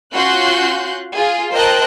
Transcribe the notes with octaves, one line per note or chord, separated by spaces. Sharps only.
C#4 F4 F#4 C6 F#6 G6
F4 G#4
A#4 C5 D#5 G5 A5 F#6